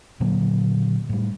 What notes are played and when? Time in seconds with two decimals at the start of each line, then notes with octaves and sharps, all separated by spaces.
0.20 A#2 D3 F#3 A#3
1.09 A2 G3